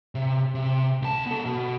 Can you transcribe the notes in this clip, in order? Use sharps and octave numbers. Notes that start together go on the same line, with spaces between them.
C3
C3
C#2 A5
B3 A4
B2